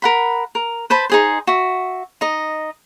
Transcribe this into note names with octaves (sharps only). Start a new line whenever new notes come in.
A#4 F#5 B5
A#4
B4 C5 A5 B5
D#4 G#4 C5
F#4 E5
D#4 D#5